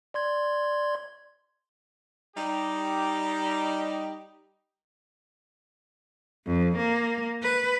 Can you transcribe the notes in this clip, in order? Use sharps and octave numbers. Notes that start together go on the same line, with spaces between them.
D5 C6 G#6
G3 D#4 G4
F2
A#3
B4